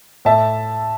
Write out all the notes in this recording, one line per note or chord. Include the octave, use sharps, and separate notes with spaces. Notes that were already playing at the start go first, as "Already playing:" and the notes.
A2 E5 A5